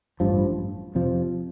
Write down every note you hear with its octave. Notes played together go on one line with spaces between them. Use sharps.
A1 G2 F3
F2 C3 F3